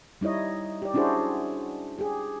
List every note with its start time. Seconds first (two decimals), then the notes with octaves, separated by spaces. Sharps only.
0.21 G3 D#4 E4 C#5 D#5
0.82 G4 D5
0.94 C#4 D4 E4 F#4 G#4 C5
1.99 G4 G#4